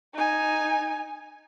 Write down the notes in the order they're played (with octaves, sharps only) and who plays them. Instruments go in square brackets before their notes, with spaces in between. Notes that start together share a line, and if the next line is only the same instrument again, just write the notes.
[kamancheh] D#4 G#5